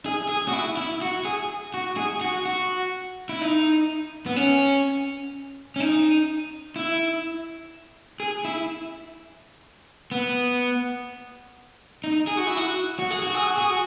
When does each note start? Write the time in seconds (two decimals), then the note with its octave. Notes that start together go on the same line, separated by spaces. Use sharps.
0.06 G#4
0.29 G#4
0.48 F#4
0.53 E4
0.77 E4
1.02 F#4
1.25 G#4
1.74 F#4
1.97 G#4
2.21 F#4
2.45 F#4
3.29 E4
3.42 D#4
4.26 B3
4.36 C#4
5.76 C#4
5.80 D#4
6.76 E4
8.20 G#4
8.45 E4
10.11 B3
12.04 D#4
12.27 G#4
12.37 F#4
12.47 E4
12.57 F#4
12.99 F#4
13.11 G#4
13.23 F#4
13.34 G#4
13.47 F#4
13.58 G#4
13.70 F#4